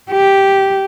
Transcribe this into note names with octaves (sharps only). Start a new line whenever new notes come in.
G4